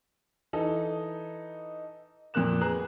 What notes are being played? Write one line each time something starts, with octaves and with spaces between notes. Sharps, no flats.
E3 D#4 A4
F2 A#2 A#3 F#6 E7
B3 G#4 A#5 F#6